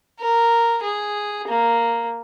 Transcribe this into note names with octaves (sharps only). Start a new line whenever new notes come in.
A#4
G#4
A#3